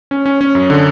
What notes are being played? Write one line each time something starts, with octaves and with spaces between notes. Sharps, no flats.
C#4
C#4
C#4
F#2
D3